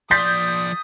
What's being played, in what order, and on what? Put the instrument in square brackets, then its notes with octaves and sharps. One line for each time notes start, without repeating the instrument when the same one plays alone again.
[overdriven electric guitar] F3 D5 [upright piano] C6 A6 B6 [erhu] D#6 [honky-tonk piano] G6